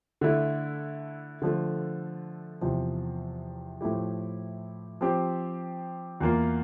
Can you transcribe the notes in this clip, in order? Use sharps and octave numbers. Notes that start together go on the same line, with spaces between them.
D3 A3 E4
D3 F3 A3
E2 C3 F3
A2 F3 A3 E4 G4
F3 C4 G4
E2 E3 A#3 F4